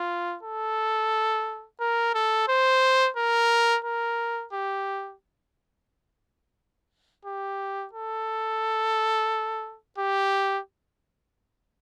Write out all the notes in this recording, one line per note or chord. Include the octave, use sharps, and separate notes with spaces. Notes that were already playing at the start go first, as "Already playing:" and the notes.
Already playing: F4
A4
A#4
A4
C5
A#4
A#4
G4
G4
A4
G4